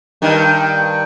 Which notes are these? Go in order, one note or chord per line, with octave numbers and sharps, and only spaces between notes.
G2 D#3